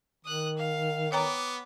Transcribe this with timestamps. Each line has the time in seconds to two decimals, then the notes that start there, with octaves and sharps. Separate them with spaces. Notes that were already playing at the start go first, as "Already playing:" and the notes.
0.25 D#3 D#6 F#6
0.57 F5
1.12 B3 C#5 G5 A#5 D6